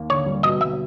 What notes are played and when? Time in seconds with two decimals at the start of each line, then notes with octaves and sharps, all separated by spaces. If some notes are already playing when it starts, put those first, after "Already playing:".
Already playing: D#2 A#3
0.10 D3 C#5
0.26 G3
0.43 B2 D#5
0.61 G3 E5